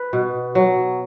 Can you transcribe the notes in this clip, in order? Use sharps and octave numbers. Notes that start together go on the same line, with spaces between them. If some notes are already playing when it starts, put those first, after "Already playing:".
Already playing: B4
B2
F#3